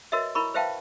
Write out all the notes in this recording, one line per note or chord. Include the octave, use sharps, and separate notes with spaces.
F#4 A#4 B4 C#5 D#5 E5
E4 A#4 B5 C#6
B4 C5 E5 F5 G5 A5